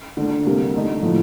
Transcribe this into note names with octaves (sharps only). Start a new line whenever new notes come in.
D3 A3 D4
C3 G3 A#3
D3 A3 D#4
A2 F3 A3 D4